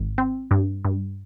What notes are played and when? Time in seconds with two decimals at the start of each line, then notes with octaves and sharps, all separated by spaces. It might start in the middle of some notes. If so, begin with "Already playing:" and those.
Already playing: G#1
0.18 C4
0.51 G2
0.85 G2